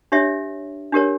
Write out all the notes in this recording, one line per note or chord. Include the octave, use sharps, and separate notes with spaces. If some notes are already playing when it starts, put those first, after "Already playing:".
D4 G4 C#5 E5
D4 G4 A#4 C#5